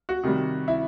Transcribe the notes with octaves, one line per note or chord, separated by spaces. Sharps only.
F#4
C3 D#3 G3
E4